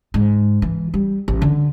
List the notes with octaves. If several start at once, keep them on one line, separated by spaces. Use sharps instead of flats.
G#2
E3
G3
A1
D3